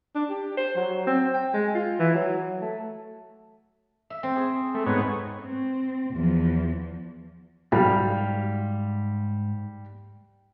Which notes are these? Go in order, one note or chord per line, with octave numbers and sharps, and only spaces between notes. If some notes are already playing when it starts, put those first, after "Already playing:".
D4
G4
C5
F#3
C4
G5
G#3
F4
E3
F#3
A3
E5
C4
G#4
A3
G#2 B3 C#5
C4
E2 F3
B1 G#2 G3 F5